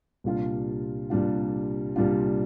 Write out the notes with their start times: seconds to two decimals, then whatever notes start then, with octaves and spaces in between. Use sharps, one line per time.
0.24 C2 A#2 G3 D4 F4
1.10 C2 A#2 G3 D4 F4
1.96 C2 A#2 G3 D4 F4